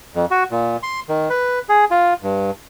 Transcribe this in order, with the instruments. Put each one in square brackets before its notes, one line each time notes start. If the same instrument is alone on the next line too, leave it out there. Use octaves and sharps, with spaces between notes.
[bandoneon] F2
F#4
A#2
C6
D#3
B4
G#4
F4
G2